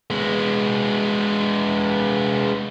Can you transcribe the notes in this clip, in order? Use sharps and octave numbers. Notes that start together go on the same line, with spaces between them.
G#3 B3